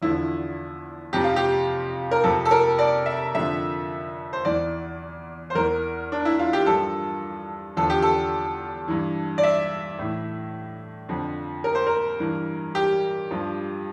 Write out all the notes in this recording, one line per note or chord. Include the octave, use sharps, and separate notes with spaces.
E2 D3 F3 E4
F2 C3 F3 G4
F4
G4
A#4
F2 C3 F3 A4
A4
A#4
D5
E5
F2 D3 F3 E5
C5
E2 E3 D5
C5
E2 E3 A#4
D4
E4
F4
G4
G2 F3 A4
E2 D3 F3 A4
G4
A4
G2 E3
D5
E5
A2 E3
F2 D3 F3
A#4
C5
A#4
G2 E3
G4
G2 F3